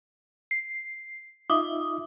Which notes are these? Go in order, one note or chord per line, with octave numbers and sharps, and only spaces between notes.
C7
D#4 F4 E5 D6 D#6